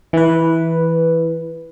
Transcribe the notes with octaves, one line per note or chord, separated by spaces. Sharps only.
E3 B4